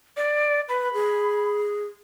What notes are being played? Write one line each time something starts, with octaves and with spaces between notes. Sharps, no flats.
D5
B4 B5
G#4